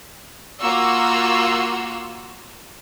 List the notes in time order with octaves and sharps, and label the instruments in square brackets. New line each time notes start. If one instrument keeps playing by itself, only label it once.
[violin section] A#3 F4 F#4 E6